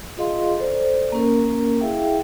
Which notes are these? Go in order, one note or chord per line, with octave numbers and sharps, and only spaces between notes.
F4 G#4 D#5 F5 C6
A4 C5 D5
A#3 C#4 A#4
E4 G#4 E5 F5 G5